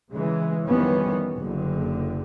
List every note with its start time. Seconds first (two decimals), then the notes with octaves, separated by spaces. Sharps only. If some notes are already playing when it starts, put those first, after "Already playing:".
0.13 C#3 E3 G#3
0.67 F2 D#3 E3 G3 B3 C#4
1.38 F#1 D3